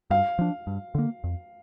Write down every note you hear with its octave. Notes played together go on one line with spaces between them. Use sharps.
G2 F5
F3 D4
G2
D3 A#3
F2